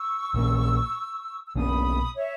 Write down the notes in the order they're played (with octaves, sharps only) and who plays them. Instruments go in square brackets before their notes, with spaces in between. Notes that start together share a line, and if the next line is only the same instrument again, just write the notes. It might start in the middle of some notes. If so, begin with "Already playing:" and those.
Already playing: [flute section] C#6 E6
[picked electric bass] A#1 A#2 A#3 C#4
[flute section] E6
[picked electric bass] B1 B2 A#3 C#4 [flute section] B5 D#6
[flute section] C#5 E5